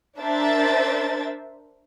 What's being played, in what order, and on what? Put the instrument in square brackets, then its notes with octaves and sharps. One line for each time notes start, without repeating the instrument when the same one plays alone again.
[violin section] D4 A#4 C5 E5 A6